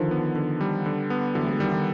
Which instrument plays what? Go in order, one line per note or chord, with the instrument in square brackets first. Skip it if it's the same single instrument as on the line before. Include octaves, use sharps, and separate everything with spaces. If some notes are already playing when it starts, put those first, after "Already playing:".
Already playing: [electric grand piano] D3 [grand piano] D#3 F3
[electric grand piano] B3
D3
G3
D3
B3
[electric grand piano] D3 [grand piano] E3 F#3
[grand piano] A3
F#3 G#3
[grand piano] D#3 [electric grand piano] G3
[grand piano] E3
D#3